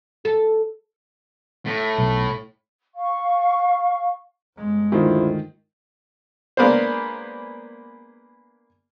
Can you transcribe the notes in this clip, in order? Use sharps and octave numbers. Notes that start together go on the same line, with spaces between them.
A4
A2
B1
F5 C#6
G1 G#3
D2 D#3 E4 F4 C5
G#3 A#3 B3 D4 C5